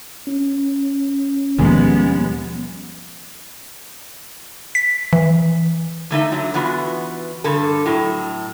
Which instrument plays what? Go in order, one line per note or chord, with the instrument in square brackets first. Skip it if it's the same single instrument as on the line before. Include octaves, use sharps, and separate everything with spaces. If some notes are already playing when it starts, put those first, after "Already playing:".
[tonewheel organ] C#4
[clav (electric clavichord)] D#2 G#4 [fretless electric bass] B2 F3 G3 [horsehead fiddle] G#3 B3
[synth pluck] B6
E3
[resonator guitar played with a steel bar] D3 A3 D#4 E5
D3 F#3
E3 B3 F4 F#4
G2 D3 A4
A2 F#3